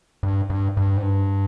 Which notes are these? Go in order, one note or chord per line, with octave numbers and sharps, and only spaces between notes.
G2
G2
G2
G#2
G2